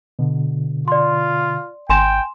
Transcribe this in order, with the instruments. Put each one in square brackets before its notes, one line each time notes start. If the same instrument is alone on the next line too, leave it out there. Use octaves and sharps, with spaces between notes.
[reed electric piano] B2 D3
[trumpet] F4 [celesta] D5 C6
[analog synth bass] G#1 [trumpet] G5 [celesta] G#5 C6 E7